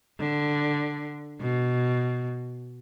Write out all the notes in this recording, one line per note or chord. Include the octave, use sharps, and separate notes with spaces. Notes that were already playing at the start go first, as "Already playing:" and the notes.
D3
B2